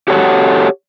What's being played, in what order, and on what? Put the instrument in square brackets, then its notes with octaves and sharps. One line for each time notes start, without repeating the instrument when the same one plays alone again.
[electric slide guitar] F#4 G4 A4 C#5 F#5